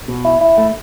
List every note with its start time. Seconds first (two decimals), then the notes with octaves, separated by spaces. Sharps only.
0.08 B2
0.25 E4
0.41 E4
0.58 A3